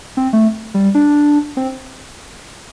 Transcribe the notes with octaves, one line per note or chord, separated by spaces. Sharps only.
C4
A3
G3
D4
C4